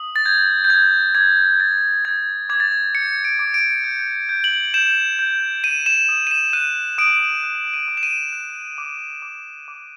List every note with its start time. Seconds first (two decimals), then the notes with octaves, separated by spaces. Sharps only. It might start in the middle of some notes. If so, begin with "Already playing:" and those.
Already playing: D#6
0.16 A6
0.25 G6 G#6
0.64 G6
0.70 D#6 G#6
1.15 D6 G#6
1.60 G6 A6
1.93 G6
2.05 G6 G#6
2.49 D6 G#6
2.60 A6
2.72 G#6
2.94 G6 C#7
3.25 D7
3.39 D6
3.54 D7
3.84 G6
4.29 G6
4.44 F#7
4.74 G6 E7
5.19 G6
5.64 G6 D#7
5.86 E7
6.09 D#6
6.27 D#7
6.31 E7
6.53 F#6 D#7
6.98 D#6 D7
7.43 F#6
7.74 D#7
7.88 D#6
7.97 E7
8.03 D#7
8.33 F#6
8.78 D6
9.22 D6
9.68 D6